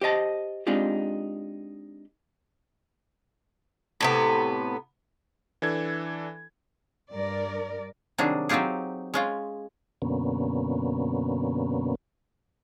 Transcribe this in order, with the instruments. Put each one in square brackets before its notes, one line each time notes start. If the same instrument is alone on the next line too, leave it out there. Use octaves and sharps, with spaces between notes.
[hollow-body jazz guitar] G4 C5 D#5 A5
G#3 C4 D4 D#4 F4 G4
[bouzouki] A2 C3 B3
[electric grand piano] E3 D4 A4 G#6
[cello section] G2 A#4 D5
[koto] C3 D#3 F#3 G3 D4 G#4
F#3 C4 D#4 F4 G4 G#4
G#3 C#4 F4
[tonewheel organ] F#2 B2 D3 A#3 B3 C#4